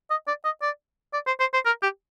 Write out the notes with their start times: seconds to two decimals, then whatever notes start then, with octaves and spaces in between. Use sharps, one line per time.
0.10 D#5
0.27 D5
0.45 D#5
0.62 D5
1.14 D5
1.27 C5
1.40 C5
1.53 C5
1.66 A#4
1.83 G4